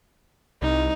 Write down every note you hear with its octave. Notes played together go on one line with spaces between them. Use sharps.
C2 D#4